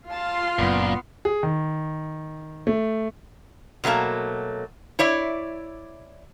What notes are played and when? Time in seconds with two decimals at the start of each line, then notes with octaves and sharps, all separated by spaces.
0.10 F4 F5 A5 C6
0.59 F#1 F#2 A#2 B3
1.25 G#4
1.43 D#3
2.67 A3
3.84 B2 F#3 A3 A#3 A5
4.99 E4 C#5 D5 E5